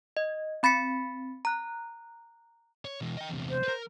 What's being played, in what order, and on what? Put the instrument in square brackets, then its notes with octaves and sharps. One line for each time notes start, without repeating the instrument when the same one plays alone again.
[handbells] D#5
C4 B5 A6 B6 C#7
A#5 F#6
[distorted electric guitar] C#5
B2 E3
D#5 G5
E2 C3
[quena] C5
[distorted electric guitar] A#4 B4